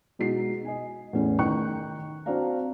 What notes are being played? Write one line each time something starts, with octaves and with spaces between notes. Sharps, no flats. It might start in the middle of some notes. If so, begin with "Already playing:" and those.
B2 G#3 D#4 F#4 C7
D#5 G#5
E2 A2 C#4
D#3 D#4 G5 C#6 F#6 C#7
C4 D4 F#4 D5 F5 A#5